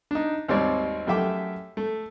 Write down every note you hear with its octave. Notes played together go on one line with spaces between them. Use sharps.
D4 D#4
G#1 D#2 G3 C4 C#5 D5
F#2 A3 G4 E5 G5 D6
A3